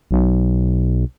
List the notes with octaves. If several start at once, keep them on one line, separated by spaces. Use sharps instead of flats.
B1